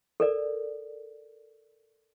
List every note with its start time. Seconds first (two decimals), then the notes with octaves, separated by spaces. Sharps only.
0.20 A4 A#4 D5